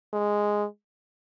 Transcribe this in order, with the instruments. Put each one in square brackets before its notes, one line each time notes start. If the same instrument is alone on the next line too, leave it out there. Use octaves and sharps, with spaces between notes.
[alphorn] G#3